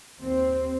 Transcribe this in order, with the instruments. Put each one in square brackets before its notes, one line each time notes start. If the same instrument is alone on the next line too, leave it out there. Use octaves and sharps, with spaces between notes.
[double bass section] D#2 C4